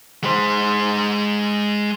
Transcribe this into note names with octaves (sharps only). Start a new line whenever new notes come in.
G#3 C5